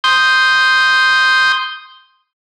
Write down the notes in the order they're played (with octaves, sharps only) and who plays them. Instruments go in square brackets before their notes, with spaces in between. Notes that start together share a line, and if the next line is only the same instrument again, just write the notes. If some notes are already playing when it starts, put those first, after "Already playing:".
[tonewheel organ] C6 D#6 G6